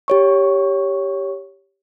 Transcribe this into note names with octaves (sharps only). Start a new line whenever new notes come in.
G4 C#5 C#6